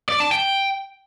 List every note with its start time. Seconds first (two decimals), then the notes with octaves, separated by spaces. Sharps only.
0.09 D5
0.20 A5
0.32 G5